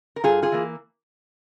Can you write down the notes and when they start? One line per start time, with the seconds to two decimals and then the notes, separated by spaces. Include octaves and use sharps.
0.16 A#4
0.24 G2 F4 G#4
0.42 F4 G#4
0.52 E3 A#3